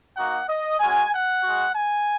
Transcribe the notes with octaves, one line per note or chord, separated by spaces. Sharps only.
A#3 D#4 F#4 F#5
D#5
G#3 C#4 F#4 G#5
F#5
G#3 F#4
G#5